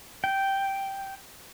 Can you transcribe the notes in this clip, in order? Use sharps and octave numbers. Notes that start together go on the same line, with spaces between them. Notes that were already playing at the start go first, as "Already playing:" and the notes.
G5